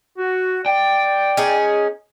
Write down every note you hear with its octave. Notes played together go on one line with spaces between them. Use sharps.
F#4
D5 G5
C#4 D#4 G#4